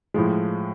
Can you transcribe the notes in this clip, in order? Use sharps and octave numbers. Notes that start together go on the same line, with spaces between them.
A2 F3 G#3